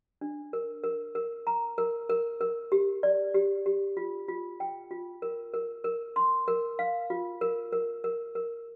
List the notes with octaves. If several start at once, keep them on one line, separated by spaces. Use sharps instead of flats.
D4
A#4
A#4
A#4
A#5
A#4
A#4
A#4
G4
D5
G4
G4
F4
F4
G5
F4
A#4
A#4
A#4
C6
A#4
F5
F4
A#4
A#4
A#4
A#4